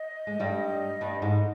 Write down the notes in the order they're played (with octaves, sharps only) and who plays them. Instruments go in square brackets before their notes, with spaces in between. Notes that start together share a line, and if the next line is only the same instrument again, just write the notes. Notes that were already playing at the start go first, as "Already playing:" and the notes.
Already playing: [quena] D#5
[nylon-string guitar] G#3
G2 G3
G2 G3
G#2 G#3